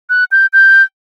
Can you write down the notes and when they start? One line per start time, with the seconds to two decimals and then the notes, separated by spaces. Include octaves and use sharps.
0.10 F#6
0.32 G6
0.53 G6